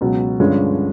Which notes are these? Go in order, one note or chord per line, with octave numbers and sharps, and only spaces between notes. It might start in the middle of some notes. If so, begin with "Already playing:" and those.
C#2 B2 F#3
G2 D3 F3 G#3 C#4